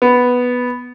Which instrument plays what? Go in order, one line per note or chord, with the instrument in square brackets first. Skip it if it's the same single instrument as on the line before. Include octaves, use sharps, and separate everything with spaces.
[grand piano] B3